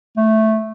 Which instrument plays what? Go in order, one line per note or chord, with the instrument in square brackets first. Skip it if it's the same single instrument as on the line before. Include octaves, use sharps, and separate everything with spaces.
[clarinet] A3